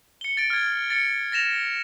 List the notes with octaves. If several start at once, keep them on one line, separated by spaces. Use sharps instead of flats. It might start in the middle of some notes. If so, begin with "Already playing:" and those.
C#7 G7
A6 D7
F6 G#6
A6 C#7
A6 A#6 E7 F7